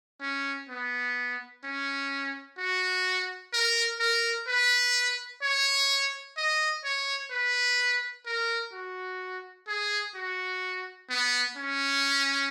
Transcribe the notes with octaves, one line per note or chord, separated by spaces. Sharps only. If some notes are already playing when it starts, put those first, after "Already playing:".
C#4
B3
C#4
F#4
A#4
A#4
B4
C#5
D#5
C#5
B4
A#4
F#4
G#4
F#4
B3
C#4